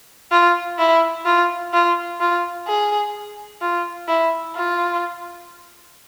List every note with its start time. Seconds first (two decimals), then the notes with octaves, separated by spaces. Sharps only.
0.31 F4
0.79 E4
1.26 F4
1.73 F4
2.20 F4
2.67 G#4
3.61 F4
4.08 E4
4.56 F4